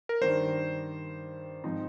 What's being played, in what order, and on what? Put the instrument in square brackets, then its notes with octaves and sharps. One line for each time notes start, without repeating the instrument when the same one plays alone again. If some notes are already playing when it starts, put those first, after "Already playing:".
[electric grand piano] A#4
[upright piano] G2 D#3 G3 D4 [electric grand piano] C5
[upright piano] G#2 F3 C4 D#4